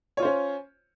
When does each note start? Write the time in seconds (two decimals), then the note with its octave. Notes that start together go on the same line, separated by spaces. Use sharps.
0.17 C#5
0.20 F4
0.22 C5
0.25 C#4